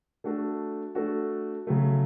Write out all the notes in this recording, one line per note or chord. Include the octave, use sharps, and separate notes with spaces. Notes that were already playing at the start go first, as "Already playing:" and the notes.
A3 D4 F#4 A4
A3 D4 F#4 A4
C#3 F#3 A3